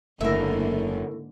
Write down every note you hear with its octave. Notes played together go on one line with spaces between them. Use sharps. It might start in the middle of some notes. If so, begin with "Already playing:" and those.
F#1 G#2 D3 A3 A#3 E4 A#4 E5